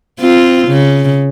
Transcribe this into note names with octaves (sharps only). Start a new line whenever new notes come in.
C4 F4
C#3